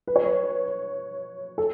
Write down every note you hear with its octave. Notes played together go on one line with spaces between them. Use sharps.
B4
C#5
B4
A4